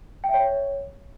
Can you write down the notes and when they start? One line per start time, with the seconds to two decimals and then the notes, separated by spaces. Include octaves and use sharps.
0.24 G5
0.29 E5
0.34 C#5